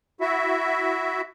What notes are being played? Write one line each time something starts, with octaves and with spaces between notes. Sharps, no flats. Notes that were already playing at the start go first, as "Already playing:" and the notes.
E4 F#4 E5